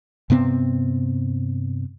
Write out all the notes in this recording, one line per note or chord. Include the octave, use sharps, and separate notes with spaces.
G2 C3 B3 C4